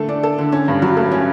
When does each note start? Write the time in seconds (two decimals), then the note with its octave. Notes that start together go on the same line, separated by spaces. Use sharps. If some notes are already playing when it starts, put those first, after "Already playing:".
Already playing: D3 A3 A4
0.09 D4
0.23 A4
0.38 D3
0.52 C#4
0.68 G2
0.82 F#3
0.97 A3
1.11 C#4